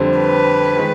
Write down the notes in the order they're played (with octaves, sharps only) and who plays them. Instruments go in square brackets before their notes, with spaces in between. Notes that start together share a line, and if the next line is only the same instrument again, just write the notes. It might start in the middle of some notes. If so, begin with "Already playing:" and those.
Already playing: [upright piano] F2 D3 G3 C4
[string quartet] B4
[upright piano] D#3 G#3